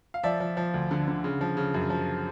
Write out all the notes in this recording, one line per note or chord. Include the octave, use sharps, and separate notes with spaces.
F5
F3 D5 E5
F3
F3
D2
D3
D3
C#3
F3
C#3
F#2
F3